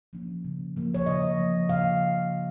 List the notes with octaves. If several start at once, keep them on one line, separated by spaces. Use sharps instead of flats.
F3 A#3 C#4
C#3
F3 A#3
C#5
C#3 D#5
F3 A#3
C#3 F5